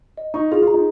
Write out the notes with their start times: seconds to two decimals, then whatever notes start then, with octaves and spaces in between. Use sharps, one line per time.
0.17 D#5
0.34 D#4 C#6
0.52 F4 G#4
0.62 F4
0.67 A#5
0.74 D#4